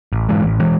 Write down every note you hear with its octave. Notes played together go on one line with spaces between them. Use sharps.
A1
G#2 E3 G#3
A1
E3 G#3